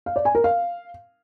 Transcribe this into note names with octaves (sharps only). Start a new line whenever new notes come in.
F5
D5
G#5
A#4
F5